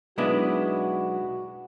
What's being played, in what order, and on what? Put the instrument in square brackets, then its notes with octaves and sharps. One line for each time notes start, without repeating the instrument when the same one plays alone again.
[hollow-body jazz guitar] B1 B3 D4 [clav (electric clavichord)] G#3 E4 D#5 [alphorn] F#4